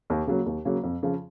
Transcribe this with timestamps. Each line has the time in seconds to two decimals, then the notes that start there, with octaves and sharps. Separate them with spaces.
0.10 D#2
0.27 C#3 F#3 A#3
0.46 D#2
0.65 C#3 F#3 A#3
0.84 F2
1.03 C#3 F3